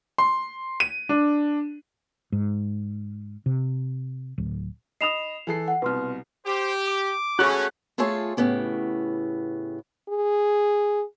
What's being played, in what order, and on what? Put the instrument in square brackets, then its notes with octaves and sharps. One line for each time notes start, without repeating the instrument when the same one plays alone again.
[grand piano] C6
D#7
D4
[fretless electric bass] G#2
C3
D1
[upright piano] D#5 B5 D#6 [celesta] C7 E7 F7
[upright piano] E3 A4 C7
[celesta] F#5
[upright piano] C2 B2 [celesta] B4 C6 F6
[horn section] G4 [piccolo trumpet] C5
[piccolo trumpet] D6
[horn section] A3 C#4 [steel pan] F#4 G#4 [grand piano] B5 F#6
[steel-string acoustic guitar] A3 F4 G#4 A4 C#5 F5
A2 C#3 B3 G4
[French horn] G#4